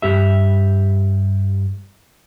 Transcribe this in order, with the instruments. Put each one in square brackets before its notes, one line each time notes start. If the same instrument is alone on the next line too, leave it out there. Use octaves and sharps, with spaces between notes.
[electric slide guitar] G2 G4 E5